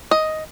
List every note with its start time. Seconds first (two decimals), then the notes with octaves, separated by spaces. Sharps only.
0.11 D#5